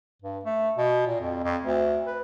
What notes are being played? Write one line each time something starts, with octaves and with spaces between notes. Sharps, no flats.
G2
A3
B2
A#2
F2
F2
D2
B4